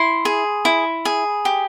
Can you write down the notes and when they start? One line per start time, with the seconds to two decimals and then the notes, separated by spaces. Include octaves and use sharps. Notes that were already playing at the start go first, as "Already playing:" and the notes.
Already playing: E4 C6
0.25 G#4
0.65 E4
1.05 G#4
1.45 G4